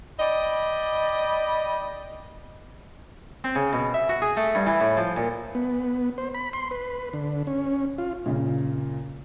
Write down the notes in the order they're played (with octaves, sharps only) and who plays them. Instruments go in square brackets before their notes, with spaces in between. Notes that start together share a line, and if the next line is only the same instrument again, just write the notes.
[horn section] D5 D#5 G5 B5
[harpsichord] C4
C#3
B2
E5
F#4
G#4
A3
G2
E3
A2
F3
A#2
[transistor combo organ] B3
C5
B5
C6
B4
D3
C#4
F4
[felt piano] A#2 C#3